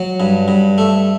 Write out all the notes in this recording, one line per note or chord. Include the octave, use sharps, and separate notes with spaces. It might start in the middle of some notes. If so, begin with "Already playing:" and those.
Already playing: F#3
G2
G2
A3